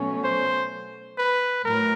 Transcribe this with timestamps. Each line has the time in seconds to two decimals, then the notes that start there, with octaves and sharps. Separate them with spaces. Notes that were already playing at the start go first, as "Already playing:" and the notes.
Already playing: B2 F#3 A3 C#4
0.24 C5
1.18 B4
1.64 A2 F#3 A#4